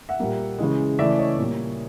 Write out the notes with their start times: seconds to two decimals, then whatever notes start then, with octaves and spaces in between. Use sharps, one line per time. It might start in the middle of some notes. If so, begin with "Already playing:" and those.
0.09 E5 F#5
0.19 A#2 G3 A#3
0.58 C#3 E3 G#3
0.99 C#3 E3 A3 D5 E5
1.18 C#5 D#5
1.38 A#2 G3 A#3